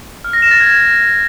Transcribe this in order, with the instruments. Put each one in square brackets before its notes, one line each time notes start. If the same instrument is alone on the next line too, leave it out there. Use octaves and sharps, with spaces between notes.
[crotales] F6
A#6
E7
A6
G#6